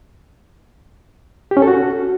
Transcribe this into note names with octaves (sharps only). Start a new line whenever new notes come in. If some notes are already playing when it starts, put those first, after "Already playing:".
G4
C#4
A4
F#4